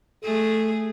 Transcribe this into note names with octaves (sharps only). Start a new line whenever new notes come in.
A3 G#4 A4